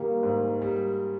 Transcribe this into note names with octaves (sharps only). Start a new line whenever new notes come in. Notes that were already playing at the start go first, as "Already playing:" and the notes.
Already playing: D#3 G3 A#3
G#2
G3